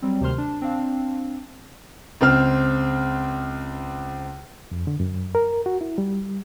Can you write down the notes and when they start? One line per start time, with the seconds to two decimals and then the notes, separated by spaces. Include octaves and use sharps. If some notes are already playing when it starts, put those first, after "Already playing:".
0.02 F#3 G3 C4
0.21 D2 C3 D#3 C5 C6 F6
0.38 D4
0.62 C4 D4 F5
2.21 C#2 C4 F6
4.72 F2
4.87 D3
5.00 F#2
5.35 A#4
5.66 F#4
5.81 E4
5.98 G3